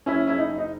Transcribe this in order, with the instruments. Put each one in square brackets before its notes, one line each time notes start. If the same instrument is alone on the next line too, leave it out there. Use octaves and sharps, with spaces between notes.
[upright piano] F#1 C#4 E4
F#1 E4
D#4
F#1
D#4